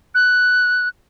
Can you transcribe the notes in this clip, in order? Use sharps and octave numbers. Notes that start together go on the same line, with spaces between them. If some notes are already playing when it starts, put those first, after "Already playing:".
F#6